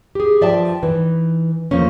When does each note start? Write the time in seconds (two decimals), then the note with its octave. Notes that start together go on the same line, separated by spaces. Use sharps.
0.15 G4 G#4
0.41 G2 F3 D5 E5 G5 A5
0.83 E3 D#4 B4
1.71 E2 F3 A3 A#3 C#4